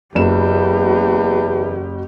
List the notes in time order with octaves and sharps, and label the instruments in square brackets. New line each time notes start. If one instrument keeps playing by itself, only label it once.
[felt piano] F#1 F#3 E7 [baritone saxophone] E2 [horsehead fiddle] G4